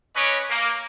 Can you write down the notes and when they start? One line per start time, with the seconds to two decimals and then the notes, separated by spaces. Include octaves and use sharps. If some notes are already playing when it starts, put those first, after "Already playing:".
0.15 C#4 B4 C#5 D#5 D6
0.49 A#3